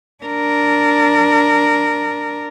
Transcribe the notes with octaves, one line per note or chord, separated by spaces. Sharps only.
D4 A#4